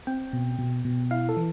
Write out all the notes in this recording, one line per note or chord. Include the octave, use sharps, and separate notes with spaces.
C4 G5
B2
B2
B2
E4 F5
A4
E3